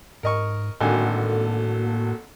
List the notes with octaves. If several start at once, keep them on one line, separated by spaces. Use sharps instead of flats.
G#2 A#4 D#5 C#6
G#1 A2 D3 A#3 F#4 A4 G#5